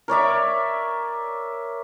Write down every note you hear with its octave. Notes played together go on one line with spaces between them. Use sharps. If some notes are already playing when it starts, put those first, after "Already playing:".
A#4 C#5 D5 E5